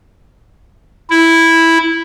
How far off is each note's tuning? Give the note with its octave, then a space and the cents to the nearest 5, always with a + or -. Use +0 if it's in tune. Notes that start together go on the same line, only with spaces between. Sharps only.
E4 -5